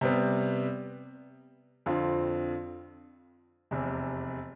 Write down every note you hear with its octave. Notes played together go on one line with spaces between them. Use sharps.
C3 G3 B3
F2 D3 F3 C4 F4
F1 E2 C3